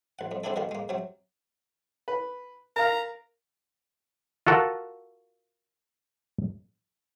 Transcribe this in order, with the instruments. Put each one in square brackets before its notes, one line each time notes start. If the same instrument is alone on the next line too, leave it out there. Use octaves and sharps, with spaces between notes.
[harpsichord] A1 F#5
F2
D3 G#3 C4 D4 E4 A4
B2 D3 D#3 A#3
G#3 A#3
C3 F#3
[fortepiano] B4
[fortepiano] A#4 F5 [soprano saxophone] A#5
[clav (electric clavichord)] F4 F#4 A4 A#4 F#5